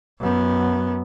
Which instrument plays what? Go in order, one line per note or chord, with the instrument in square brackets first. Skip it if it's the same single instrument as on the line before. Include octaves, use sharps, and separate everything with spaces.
[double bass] F#2 B3